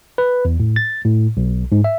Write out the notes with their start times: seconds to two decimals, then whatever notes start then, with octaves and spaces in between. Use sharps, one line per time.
0.18 B4
0.45 E2
0.60 A2
0.76 A6
1.05 A2
1.37 B1
1.72 G#2
1.84 E5